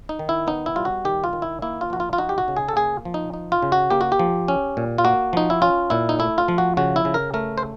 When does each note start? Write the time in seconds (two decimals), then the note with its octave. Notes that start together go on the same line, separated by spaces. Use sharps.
0.09 D#4
0.19 D#3
0.29 E4
0.47 B3 D#4
0.66 E4
0.76 G3 F4
0.85 F#4
1.05 D#3 G4
1.24 F4
1.33 D#3
1.42 E4
1.62 A#3 E4
1.81 F4
1.90 F3 F#4
2.00 F4
2.13 F4
2.18 D#4 F#4
2.29 G4
2.38 F#4
2.48 C#3
2.57 G#4
2.69 A4
2.76 A#3 G#4
3.05 F3
3.14 D#4
3.34 D#4
3.52 F4
3.63 C#3
3.72 F#4
3.90 A#3 G4
4.01 F#4
4.12 G4
4.19 F3
4.48 C#4
4.77 A#2
4.98 F4
5.05 A#3 F#4
5.33 F3 D#4
5.50 E4
5.62 C#4 F4
5.90 A#2 E4
6.09 D#4
6.19 A3 E4
6.38 F4
6.48 F3
6.58 F#4
6.77 C#3 F#4
6.96 E4
7.05 C#3
7.14 A#4
7.34 A3 A#4
7.58 C5